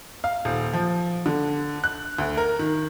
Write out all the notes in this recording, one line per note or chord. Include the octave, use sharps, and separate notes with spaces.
F5
D#1
F3
D3
F#6
D2
A#4
D#3